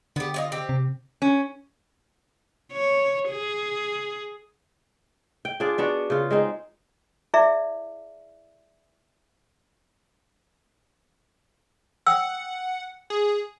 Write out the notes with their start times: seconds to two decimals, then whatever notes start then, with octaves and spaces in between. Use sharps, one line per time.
0.16 D3 B3 G4
0.34 F4 C#5 D#5
0.52 C4 G4
0.69 C3
1.22 C#4
2.72 C#5
3.30 G#4
5.45 G5
5.60 D4 F4 G#4 D5
5.78 B3 D4 F#4
6.10 C#3 F4
6.31 G#3 C4 D#4
7.34 E4 G#4 D5 E5
12.06 F#5 G5 D#6 E6
13.10 G#4